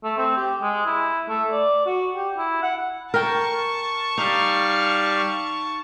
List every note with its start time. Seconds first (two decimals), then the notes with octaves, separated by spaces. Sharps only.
0.04 A3
0.17 C4
0.37 G4
0.62 G#3
0.86 E4
1.29 A3
1.51 D5
1.86 F#4
2.16 G4
2.38 E4
2.62 F#5
3.14 A#4 G5 A5 C#6
4.18 G3 D#4 F5 F6